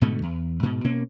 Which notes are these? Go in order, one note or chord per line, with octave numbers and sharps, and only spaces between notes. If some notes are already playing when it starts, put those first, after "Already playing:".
G#2 B2 D3 A3
E2
G#2 B2
B2 A#3 C#4